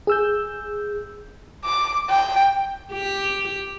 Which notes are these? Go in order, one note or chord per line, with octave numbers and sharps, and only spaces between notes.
G#4 E6 G6
D6
G5
G4